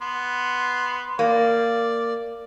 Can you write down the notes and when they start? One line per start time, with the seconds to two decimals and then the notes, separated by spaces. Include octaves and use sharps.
0.02 B3 C6
1.19 A#3 D5